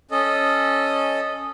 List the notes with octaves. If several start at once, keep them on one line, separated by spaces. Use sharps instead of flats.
C#4 A4 D#5